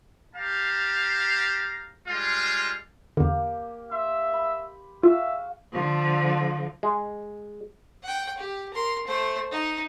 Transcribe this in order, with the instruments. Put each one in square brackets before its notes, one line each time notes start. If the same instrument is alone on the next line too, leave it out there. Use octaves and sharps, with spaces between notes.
[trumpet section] G4 F5 A5 A#5
G3 G#3 F4 F5
[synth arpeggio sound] E2 D3 [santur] A#3 G4
[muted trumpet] E5 [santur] C6
[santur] B5
[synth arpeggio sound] F4 [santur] F#4 G#4 F5 [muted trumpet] E5
[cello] D3 F3
[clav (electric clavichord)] G#3
[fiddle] F#5 G5
G4
A#4 C6
A3 C5
D#4